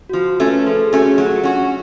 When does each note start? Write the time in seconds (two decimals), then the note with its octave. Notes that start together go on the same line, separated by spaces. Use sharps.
0.09 F#4
0.13 F3 F4
0.40 A3 C#4
0.48 B4
0.57 A4
0.66 F3 G#4
0.86 G#4
0.93 A3 C#4 F#4
1.18 F#3 F4
1.43 C#4 D4 F#4